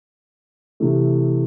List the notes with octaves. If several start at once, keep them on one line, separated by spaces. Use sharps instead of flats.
C3 E3 A3